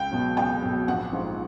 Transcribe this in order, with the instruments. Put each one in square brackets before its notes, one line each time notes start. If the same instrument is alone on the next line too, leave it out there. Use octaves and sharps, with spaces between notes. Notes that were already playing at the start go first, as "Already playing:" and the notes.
Already playing: [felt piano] C#2 G5
B2 F#3
C#2 G5
B2 F#3
A#1 F#5
G#2 F3